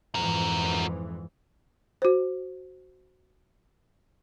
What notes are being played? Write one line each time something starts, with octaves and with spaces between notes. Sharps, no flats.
F2 G#2 E3 F#4 A#4
F#4 C5